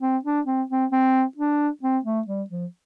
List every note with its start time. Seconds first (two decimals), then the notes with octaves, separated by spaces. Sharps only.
0.02 C4
0.25 D4
0.47 C4
0.70 C4
0.92 C4
1.37 D4
1.83 C4
2.05 A3
2.27 G3
2.50 F3